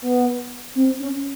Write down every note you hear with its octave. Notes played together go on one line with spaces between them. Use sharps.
B3
C4
C#4